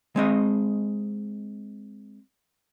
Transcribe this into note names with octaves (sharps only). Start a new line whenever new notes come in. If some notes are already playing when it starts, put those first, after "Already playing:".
G#3 C4 D#5